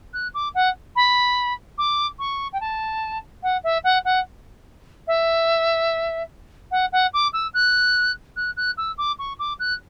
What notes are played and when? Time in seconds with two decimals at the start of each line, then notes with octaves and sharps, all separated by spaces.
0.13 F#6
0.34 D6
0.54 F#5
0.95 B5
1.78 D6
2.19 C#6
2.53 G5
2.60 A5
3.43 F#5
3.63 E5
3.84 F#5
4.04 F#5
5.07 E5
6.71 F#5
6.92 F#5
7.13 D6
7.33 E6
7.54 F#6
8.36 F#6
8.56 F#6
8.77 E6
8.98 D6
9.19 C#6
9.39 D6
9.59 F#6